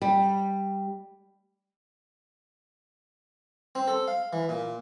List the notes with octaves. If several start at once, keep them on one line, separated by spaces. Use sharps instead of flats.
G3
C4
A4
F5
E3
A#2